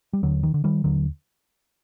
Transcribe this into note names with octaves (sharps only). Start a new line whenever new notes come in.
G3
D#2 D3 F#3
D#3
D3
D#3 G3
D#2 D3 F#3